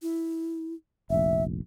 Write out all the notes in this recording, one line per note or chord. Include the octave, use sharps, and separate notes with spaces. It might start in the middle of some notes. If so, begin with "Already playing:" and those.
E4
F1 A#1 E5